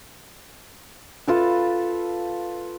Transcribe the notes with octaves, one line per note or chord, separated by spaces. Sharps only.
F4 A4 B4